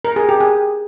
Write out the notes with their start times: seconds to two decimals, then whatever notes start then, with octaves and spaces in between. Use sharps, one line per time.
0.05 A#4
0.16 G#4
0.29 G4
0.40 G#4